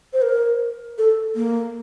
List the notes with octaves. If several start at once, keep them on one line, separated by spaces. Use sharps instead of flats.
C5
A#4
A4
A#3